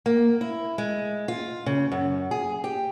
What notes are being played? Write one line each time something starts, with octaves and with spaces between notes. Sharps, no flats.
A#3
E4
G#3
F4
C#3
F#2
G#4
G4